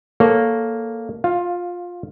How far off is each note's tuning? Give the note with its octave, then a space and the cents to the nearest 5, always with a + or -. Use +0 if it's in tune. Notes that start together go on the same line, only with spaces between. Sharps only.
A#3 +0 A4 +0 C#5 +0
F4 +15 F5 +0